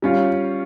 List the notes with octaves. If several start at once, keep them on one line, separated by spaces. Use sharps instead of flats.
G3 C#4 F4